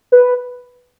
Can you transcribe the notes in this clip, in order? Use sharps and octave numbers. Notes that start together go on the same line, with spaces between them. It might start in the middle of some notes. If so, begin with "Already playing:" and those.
B4